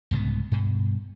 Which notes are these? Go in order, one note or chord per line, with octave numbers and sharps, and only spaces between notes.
C2 G#2 C#3 B3
G2 B2